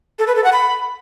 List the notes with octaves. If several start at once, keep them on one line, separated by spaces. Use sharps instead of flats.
A4
B4
A4
F#5
B5